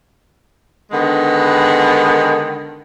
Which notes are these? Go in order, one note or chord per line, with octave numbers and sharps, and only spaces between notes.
D3 D#3 G#3 B3